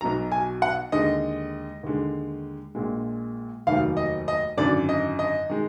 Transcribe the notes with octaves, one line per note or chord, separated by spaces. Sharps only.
B1 B2 F#3 A#5
G#5
F#5
D#2 D3 G#3 D#5
D#2 D3 G#3
A#1 A#2 G#3
F1 D#2 D#3 F#3 F5
D#5
D#5
G#1 F#2 D3 D5
D#5
D#5
D#3 G#3